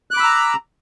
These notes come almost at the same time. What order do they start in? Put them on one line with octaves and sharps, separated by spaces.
F#6 D6 B5 E6 A#5